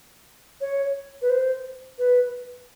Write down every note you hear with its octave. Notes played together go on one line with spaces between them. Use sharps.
C#5
B4
C5
B4